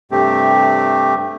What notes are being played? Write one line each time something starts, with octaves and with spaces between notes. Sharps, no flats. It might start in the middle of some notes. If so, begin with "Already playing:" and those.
G2 C3 A3 C4 G4